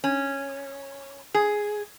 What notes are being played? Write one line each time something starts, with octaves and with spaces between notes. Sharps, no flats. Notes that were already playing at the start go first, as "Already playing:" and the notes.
C#4
G#4